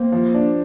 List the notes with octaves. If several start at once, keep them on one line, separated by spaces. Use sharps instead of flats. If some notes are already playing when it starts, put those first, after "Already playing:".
Already playing: A#3 C4
F3
D4